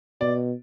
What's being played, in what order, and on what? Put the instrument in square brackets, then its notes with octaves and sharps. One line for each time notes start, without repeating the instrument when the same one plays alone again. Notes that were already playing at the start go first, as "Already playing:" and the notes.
[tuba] B2 [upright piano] D5